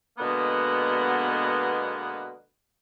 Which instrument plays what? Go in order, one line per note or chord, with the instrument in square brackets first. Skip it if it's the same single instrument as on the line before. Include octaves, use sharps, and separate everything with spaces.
[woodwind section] B2 D3 G#3 A#3 B3